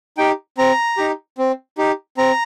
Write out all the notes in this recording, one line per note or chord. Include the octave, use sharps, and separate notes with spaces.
D#4 G4 G5
C4 A#5
D#4 G4
C4
D#4 G4
C4 A#5